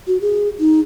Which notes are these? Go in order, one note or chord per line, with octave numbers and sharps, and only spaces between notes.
F#4
G#4
D#4